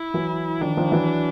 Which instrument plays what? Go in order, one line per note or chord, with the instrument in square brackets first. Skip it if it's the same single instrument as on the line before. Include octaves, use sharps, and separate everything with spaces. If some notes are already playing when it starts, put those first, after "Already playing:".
Already playing: [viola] E4
[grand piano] E3 F#3
[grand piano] D#3 F3 [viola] D4
[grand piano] D#3 F3
E3 F#3